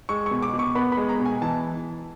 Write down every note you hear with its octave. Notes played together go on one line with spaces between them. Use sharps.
G#3 C#6
C#6
B2
D6
B2
C#6
B3 B5
B5
G#3
A#5
B2
G#5
E3 A5